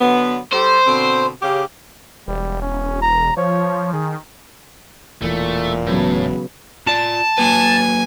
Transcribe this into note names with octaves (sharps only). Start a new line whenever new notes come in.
D3 F#3 B3
G3 G4 A4 C5
B2 D3 C4
C#3 G4
E1 G3
C#4
A#5
F3 C#5
D#3 G#4
E1 A#2 E3 A3
A2 C#3 F#3 B3
F4 D5 A5
F#3 A#3 B4 G#5